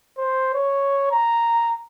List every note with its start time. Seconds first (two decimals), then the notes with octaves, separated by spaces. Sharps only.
0.18 C5
0.55 C#5
1.12 A#5